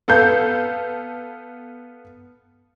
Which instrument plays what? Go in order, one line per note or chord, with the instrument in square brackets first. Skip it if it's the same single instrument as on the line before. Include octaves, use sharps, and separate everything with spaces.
[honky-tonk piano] B3 A4 F5 G6